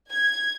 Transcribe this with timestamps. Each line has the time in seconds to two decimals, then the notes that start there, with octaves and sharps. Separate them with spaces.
0.10 G#6